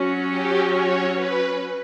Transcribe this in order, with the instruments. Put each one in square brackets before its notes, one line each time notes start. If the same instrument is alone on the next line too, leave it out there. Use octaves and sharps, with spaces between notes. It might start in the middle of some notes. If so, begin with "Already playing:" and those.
Already playing: [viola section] F#3 C#4 F#4
[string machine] G4
C#5
B4